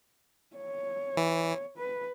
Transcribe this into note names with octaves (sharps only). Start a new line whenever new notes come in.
C#5
E3
B4